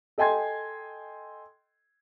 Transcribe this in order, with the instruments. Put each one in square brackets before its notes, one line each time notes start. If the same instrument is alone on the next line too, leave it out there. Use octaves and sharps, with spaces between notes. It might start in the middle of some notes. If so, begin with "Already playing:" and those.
[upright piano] A4 D#5 G5 G#5 C6 G#6